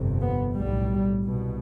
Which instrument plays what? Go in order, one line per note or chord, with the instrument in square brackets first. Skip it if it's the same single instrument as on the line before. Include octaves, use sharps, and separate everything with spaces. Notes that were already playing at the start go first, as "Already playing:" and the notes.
Already playing: [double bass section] G1 F2 C3
B3
B1 A2 G3
C2 B2